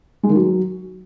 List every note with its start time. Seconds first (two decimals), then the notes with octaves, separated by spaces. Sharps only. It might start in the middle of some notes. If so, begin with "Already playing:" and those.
0.23 G#3
0.29 D#3
0.35 F#3